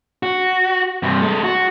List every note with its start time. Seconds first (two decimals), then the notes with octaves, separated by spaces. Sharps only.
0.23 F#4
1.03 G2 C3
1.22 G#3 A4
1.43 F#4